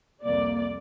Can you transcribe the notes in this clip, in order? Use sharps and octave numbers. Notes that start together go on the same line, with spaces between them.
C2 F2 A#3 D5